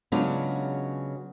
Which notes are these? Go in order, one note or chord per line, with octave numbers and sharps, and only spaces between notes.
C#3 F#3 G#3 B3 D4 F4